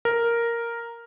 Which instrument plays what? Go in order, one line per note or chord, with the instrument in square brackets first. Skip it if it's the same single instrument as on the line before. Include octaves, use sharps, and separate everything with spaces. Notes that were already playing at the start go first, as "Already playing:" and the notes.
[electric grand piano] A#4